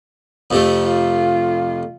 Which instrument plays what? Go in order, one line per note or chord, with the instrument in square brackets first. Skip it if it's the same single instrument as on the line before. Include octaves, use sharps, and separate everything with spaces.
[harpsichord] F2 C3 A3
[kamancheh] F4